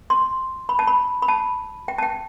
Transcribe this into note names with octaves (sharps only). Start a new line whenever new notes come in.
C6
B5
A5
B5
B5
A5
G5
A5
G5